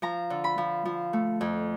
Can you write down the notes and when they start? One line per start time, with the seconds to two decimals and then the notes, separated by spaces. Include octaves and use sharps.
0.02 F3 A#5
0.30 D3
0.44 B5
0.58 F3
0.85 F3
1.13 A3
1.41 F2